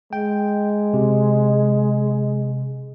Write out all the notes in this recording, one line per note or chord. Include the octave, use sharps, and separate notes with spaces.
G#3 G5
C3